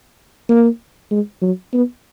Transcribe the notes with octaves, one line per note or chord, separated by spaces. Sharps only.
A#3
G#3
F#3
B3